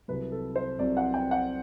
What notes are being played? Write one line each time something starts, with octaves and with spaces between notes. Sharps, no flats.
C2 C3 F#3 B4
A4
C5
C2 C3 F#3 D5
F#5
G5
F#5